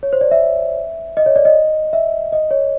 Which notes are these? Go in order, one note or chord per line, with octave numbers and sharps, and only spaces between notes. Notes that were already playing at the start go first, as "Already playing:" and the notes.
C#5
C5
D5
E5
D#5
C#5
D5
D#5
E5
D#5
C#5